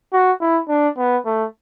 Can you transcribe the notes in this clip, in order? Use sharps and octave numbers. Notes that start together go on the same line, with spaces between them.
F#4
E4
D4
B3
A3